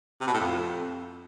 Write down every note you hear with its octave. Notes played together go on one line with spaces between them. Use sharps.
C3
B2
A2
F2